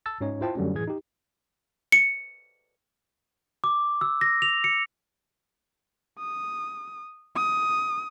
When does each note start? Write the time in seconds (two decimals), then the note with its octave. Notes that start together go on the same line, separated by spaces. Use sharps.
0.06 A5 E6 A6
0.21 G#2 C#4 D#4 C#5
0.41 E4 F4 C5 G5 A5
0.55 F#2 D3 F#3 G3 A3 C#4
0.75 A2 E3 G#4 G#6
0.87 D#4 G4
1.92 C#7
3.64 D6
4.01 E6
4.21 A#6
4.42 F7
4.64 C#7
6.19 D#6
7.36 D#6